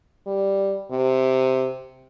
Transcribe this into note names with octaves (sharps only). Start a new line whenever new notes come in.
G3
C3